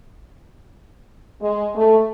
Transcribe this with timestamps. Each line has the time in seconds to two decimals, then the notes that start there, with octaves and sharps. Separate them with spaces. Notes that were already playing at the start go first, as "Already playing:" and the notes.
1.42 G#3
1.75 A3